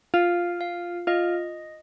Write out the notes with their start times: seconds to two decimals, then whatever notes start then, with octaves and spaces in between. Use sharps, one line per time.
0.14 F4 F5
0.61 F5
1.07 F4 D#5